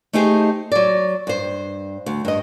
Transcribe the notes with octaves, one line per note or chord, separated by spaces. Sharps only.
A3 D#4 E4 G4 G#4 C5
F#3 D5
G2 C5
D2
G2 D#5